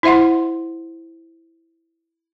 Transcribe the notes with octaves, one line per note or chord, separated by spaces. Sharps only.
E4 C5 E5 F#5 C6